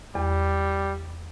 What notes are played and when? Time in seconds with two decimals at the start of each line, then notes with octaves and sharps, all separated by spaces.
0.15 E2 G3